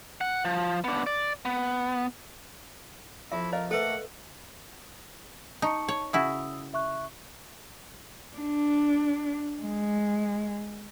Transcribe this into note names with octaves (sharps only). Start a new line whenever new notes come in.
F#5
F3
B3 D4
D5
B3
F2 E4 E5
A#4 C5 D#5 F5
A3 A#3 A4 B4 F#5
D#4 A5 C#6 C#7
C#5
C#3 E4 F#4 D#6 E6
E5 C#6 F#6
D4
G#3